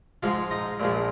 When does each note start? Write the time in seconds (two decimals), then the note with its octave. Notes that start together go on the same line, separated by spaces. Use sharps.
0.23 G#2 F3 G#3 F4 F5
0.51 D#4 D#5
0.80 A#1 A#2 F3 G#3